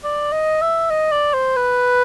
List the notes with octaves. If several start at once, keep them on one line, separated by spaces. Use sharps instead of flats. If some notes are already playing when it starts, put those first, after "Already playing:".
D5
D#5
E5
D#5
D5
C5
B4